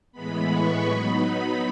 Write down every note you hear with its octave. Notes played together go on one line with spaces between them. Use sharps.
A2 E3 G#3 B3 B5
C#6
F#3 B3 D#4 B5